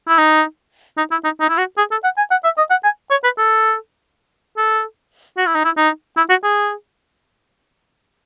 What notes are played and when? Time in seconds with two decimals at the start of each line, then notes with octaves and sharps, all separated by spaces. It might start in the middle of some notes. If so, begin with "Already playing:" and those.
0.08 E4
0.18 D#4
0.98 D#4
1.12 E4
1.25 D#4
1.41 D#4
1.50 E4
1.58 F#4
1.78 G#4
1.92 A4
2.04 F#5
2.18 G#5
2.31 F#5
2.45 E5
2.58 D#5
2.71 F#5
2.84 G#5
3.11 C#5
3.24 B4
3.38 A4
4.58 A4
5.38 F#4
5.47 E4
5.56 D#4
5.65 E4
5.77 D#4
6.17 E4
6.30 F#4
6.44 G#4